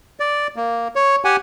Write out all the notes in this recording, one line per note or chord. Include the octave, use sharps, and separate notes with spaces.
D5
A#3
C#5
G4 F#5 G#5